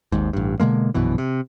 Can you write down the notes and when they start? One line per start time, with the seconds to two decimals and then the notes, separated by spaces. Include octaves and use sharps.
0.12 G#1 D#2 G#2
0.33 A1 G2
0.60 B2 D3 G#3 A#3
0.94 A#1 F#2 B2 E3
1.18 C3